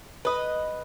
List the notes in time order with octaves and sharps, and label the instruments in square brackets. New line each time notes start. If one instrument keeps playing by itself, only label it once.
[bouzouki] B4 D#5